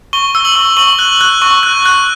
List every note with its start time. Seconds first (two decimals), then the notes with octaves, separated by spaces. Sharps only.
0.13 C#6 G7
0.35 E6
0.45 F#7
0.56 C#6
0.77 C#6 F#7
0.99 F#6
1.21 F#6
1.42 C#6
1.63 F#6
1.86 F#6